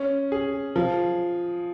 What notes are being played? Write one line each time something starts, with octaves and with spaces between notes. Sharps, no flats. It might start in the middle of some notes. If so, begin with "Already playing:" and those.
Already playing: C#4
G#4
F3